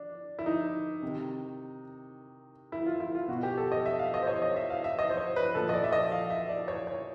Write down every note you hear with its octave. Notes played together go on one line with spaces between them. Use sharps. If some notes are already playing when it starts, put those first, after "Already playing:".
Already playing: D4
E4
D#4
C3 D#3
E4
F4
E4
F4
B2 F#4
G4
A4
D#5
E5
F5
D#5
C5
C#5
D#5
E5
F5
E5
D#5
C5
C#5
B4
A#2 F3 A4
D#5
D5
E5
D#5
F5
E5
D5
C#5
C#5